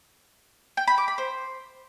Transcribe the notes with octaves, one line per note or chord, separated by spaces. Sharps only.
G5
B5
D6
B5
C5